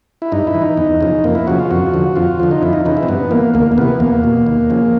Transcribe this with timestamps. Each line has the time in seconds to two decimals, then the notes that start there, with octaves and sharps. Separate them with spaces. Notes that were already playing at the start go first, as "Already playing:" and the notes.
0.22 E4
0.32 G2 D#4
0.47 E4
0.54 E3
0.62 D#4
0.77 E2
1.01 C#3 F3
1.24 F2 A#3
1.35 E4
1.47 C#3 F3 F#4
1.59 F4
1.71 F2 F#4
1.94 D3 F3
2.15 F2 F4
2.40 D3 F3
2.51 D#4
2.62 F2 E4
2.73 D#4
2.85 C#3 E3 D#4
2.97 E4
3.03 C4
3.08 G2 B3
3.31 E3 A#3
3.54 D2 A#3
3.72 A#3
3.78 C3 E3 B3
4.00 E2 A#3
4.24 B2
4.46 D#2
4.70 C#3 F3